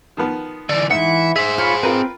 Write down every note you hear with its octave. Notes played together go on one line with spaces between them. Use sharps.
D#3 F3 B3
D3 E3 D5
G#2 E3 E5 F#5
G#4 C5 E5
F4 C#5 B5 F6
C4 F4 A#4 B4